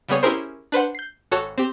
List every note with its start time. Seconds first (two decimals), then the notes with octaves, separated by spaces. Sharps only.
0.09 C#3 G3 B3 G#4 C#5
0.23 C#4 E4 G4 G#4 A#4 C5
0.72 D4 B4 C5 F#5
0.95 G6 C7
1.31 G#1 F#4 A4 C#5 F#5 A5
1.58 C4 G4